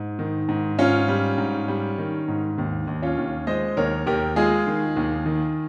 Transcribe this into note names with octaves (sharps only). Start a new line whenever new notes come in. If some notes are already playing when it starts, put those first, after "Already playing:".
Already playing: G#2
D#3
G#2
G#2 C#4 F4
G3
G#2
G3
D#3
G#2
D#2
D#2
C#4 F4
D#2
G#3 C5 D#5
D#2 A#4 C#5
D#2 G4 A#4
G#3 F4 G#4
D#3
D#2
D#3